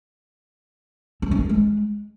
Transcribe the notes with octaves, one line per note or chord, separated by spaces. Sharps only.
C4
C#4
A#3
G#3